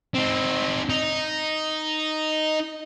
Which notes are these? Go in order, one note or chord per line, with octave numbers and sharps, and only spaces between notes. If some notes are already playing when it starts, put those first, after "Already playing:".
C4 D#4
D#4